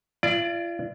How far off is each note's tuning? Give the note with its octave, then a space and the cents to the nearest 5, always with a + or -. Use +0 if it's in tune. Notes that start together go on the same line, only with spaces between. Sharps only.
F4 -40 D5 +10